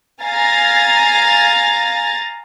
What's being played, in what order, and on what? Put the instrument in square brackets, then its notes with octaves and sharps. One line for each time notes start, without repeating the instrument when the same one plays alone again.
[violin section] F5 G#5 A#5 A6